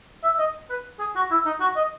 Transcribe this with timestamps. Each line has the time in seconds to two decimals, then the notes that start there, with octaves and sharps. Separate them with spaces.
0.24 E5
0.39 D#5
0.70 B4
0.99 G#4
1.16 F#4
1.31 E4
1.46 D#4
1.60 F#4
1.76 D#5